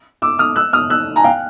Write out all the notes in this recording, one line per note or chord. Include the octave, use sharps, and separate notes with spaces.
D6 E6
D#6 F6
E6 F#6
D#6 F6
E6 F#6
G#5 A#5
F5 G5